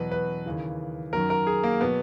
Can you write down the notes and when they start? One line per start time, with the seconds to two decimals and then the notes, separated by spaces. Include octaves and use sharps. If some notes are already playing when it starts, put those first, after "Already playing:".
Already playing: E2 B2 F#3 B4
0.11 B4
0.46 D#2 C#3 E3
1.13 F#2 D#3 F#3 A#4
1.30 A#4
1.47 G#4
1.63 A#3
1.81 B2 F#3 B3